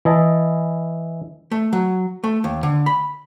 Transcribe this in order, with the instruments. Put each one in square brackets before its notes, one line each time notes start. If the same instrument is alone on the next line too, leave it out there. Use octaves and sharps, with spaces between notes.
[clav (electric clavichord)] E3 E4 D#5 A5
[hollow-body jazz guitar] A3
F#3
A3
D#2
D3
B5